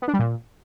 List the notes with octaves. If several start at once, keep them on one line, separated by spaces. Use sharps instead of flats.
B3
D4
G3
A#2